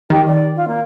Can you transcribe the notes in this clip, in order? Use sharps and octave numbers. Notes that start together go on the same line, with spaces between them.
D#3 G4
D5
F4
A#3